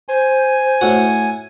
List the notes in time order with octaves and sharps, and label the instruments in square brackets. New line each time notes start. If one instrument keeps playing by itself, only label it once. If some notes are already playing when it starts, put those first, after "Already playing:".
[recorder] C5 [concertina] G#5
[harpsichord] A2 F#4